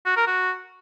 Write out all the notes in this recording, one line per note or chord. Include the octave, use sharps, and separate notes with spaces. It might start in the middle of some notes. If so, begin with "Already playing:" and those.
F#4
A#4
F#4